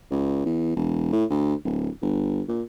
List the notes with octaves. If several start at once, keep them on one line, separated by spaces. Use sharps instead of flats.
C#2
E2
E1
A2
D2
D1
G1
A#2